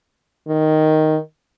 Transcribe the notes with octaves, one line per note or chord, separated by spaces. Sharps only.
D#3